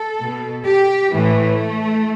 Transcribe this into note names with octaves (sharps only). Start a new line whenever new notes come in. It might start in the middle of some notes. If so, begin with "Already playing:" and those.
Already playing: A4
B2
G4
A2 E3 A3